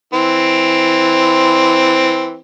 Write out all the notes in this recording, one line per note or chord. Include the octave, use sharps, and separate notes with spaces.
E3 C4